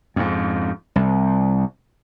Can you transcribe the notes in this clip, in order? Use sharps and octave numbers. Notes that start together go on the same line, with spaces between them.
F2 G#2
C2